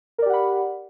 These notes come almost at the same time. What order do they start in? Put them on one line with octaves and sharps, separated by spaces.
A#4 D5 G4 F#5 B5